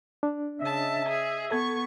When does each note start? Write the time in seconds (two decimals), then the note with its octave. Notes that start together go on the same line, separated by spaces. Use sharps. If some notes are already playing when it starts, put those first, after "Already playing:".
0.23 D4
0.60 C#3 D#5 E5 A5
1.07 G#4
1.51 B3 A4 C#6 G#6